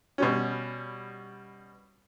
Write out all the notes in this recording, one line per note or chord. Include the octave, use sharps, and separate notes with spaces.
B2 G3 C#4